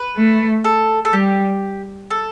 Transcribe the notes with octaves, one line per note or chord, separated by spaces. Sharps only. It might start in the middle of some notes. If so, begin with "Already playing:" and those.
Already playing: B4
A3
A4
A4
G3 G4
A4